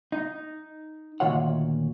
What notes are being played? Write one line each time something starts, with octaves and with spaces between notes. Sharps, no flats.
D#4
D2 A#2 D#3 F4 C#5 F#5